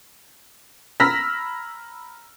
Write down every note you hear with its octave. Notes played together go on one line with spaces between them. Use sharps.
A#5 B5 E6 F6 A#6 B6